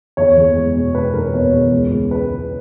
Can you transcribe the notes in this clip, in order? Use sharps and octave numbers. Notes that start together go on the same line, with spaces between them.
E2 C#5
E2
G#3
B2
G#3 B4
E2 A#4
B2 C#5
E2
C#2
C#2
G#3 B4
C#3